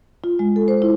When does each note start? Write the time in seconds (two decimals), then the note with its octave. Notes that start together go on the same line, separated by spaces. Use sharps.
0.24 F4
0.39 G#3
0.56 A4
0.68 C5
0.82 E4